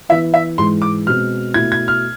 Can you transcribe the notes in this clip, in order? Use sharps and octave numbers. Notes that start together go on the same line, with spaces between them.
E3 B3 E4 E5
E5
G#2 E3 G#3 C6
D6
B2 G#3 C4 F6
B2 A3 E4 G#6
G#6
F6